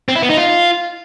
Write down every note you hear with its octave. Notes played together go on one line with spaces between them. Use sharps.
C4
E4
B3
D#4
F4